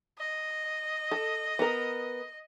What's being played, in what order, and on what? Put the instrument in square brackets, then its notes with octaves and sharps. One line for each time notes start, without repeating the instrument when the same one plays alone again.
[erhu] D#5
[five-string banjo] A4
B3 A#4